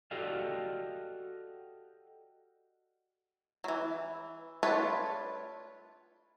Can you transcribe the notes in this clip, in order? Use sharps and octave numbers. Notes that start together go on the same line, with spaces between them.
F#4 G4 A4 D5 D#5 F5
E3 F#3
A3 D4 F4 B4 C#5